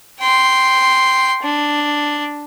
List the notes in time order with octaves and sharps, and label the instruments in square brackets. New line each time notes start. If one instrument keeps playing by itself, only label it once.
[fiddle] G5 C6
D4